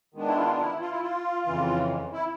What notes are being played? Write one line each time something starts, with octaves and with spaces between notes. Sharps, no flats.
D#3 G#3 B3 D4
E4
F4
E4
F4
E4
F4
F2 C#3 E3
E4